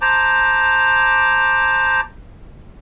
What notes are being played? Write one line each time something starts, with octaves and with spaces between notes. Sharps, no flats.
C5 A5 A#5 D6